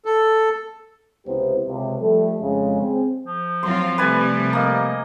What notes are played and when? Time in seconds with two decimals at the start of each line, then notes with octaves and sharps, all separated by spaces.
0.05 A4
1.26 C#2 C3 B3 E4 G4 C5
1.67 C#2 C3
2.01 F3 G3 A3 A4
2.41 F2 C#3 G#3
2.81 C4 G#4
3.27 F3
3.63 F#3 C4 F4 C6
3.98 C3 G3 A3 B4 D5 G#5
4.53 A#3 D#5